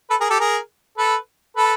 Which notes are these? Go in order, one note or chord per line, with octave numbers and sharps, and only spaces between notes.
A4 B4
G#4 A#4
G4 A4
G#4 A#4
A4 B4
A4 B4